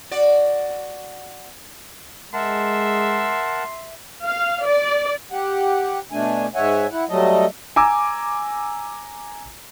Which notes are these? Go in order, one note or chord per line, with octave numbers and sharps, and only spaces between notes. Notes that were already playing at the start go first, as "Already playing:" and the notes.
F#4 D5
G#3 A#4 E5 F#5 A5 C6
F5
D5
G4 F#5
B2 A3 D4 G#5
G#2 G#3 C#5 E5 F#5 G#5
E4 F#5
F#3 G3 A3 A4 D#5
G#5 A#5 D6 E6